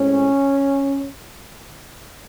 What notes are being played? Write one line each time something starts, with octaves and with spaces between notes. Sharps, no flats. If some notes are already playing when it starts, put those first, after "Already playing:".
Already playing: A2 G#3 C4 C#4